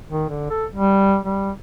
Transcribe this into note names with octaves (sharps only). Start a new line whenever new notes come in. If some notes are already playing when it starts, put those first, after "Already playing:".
D#3
D3
A4
G3
G3